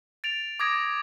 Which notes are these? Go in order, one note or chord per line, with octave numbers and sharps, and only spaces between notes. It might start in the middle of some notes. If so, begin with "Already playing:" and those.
A6 D7 F7
D6 D#6 G#6 A#6 D7